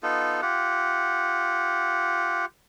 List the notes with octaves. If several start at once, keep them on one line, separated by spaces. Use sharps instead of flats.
B3 D#4 F4 A4
F4 G4 F#5